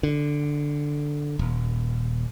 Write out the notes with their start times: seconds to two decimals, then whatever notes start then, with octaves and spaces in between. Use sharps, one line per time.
0.03 D3
1.39 D#1